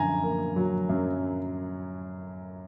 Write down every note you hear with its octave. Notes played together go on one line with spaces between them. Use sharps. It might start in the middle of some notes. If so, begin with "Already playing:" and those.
Already playing: F#2 D3 G#5 A#5
A#3
F#3
F#2